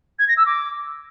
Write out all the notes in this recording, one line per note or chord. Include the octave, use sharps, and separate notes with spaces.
G#6
A#6
E6
D6